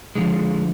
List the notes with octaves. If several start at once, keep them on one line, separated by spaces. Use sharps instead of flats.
D3 F3 G#3